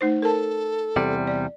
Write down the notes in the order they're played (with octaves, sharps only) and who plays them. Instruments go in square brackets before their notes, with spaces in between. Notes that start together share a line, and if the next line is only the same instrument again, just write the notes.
[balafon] A3 D#4 C5
[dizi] A4 [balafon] A#4 A5
[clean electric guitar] E2 C3 G3
[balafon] D5